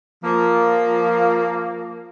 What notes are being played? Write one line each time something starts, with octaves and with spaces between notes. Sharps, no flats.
F3 A#3